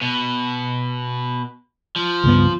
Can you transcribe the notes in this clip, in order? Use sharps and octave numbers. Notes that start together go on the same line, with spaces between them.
B2
F3
C#2 G2 B3